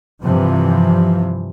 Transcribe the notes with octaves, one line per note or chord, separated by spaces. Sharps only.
G2 C3 E3 F3